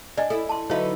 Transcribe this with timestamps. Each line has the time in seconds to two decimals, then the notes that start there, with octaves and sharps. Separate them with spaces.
0.18 D4 D5 D#5 G#5
0.30 E4 A4
0.49 A5 C6
0.70 D3 F#3 D#4 E4 B4 C#5 F5